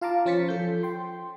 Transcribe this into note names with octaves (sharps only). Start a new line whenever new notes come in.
F4 F5 A5 A#5 D6
F3 C#4 C5 A6 B6 C#7
F3 A4 G6
G5 C6